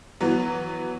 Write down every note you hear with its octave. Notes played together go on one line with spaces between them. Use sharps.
E3 F#3 B3